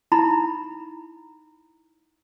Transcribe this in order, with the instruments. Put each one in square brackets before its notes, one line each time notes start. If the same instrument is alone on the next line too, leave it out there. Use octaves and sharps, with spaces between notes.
[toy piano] D#4 E4 A#5 B5